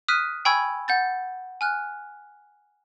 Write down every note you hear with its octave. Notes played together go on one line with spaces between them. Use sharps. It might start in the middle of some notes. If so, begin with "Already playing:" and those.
D#6 F6 F#6 B6 D#7
G5 G#5 B5 C#6 E6 G#6
F#5 G6 A6
G#5 F6 F#6